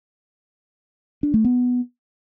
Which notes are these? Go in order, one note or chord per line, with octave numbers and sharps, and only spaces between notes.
D4
A3
B3